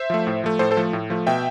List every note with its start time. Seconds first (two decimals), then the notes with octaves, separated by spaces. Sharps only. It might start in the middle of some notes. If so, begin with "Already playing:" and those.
Already playing: C5 E5
0.10 F3 A3
0.27 A2
0.44 F3 A3
0.59 A2 A4 C5
0.71 A4 C5
0.77 F3 A3
0.93 A2
1.10 F3 A3
1.27 B2 E5 G5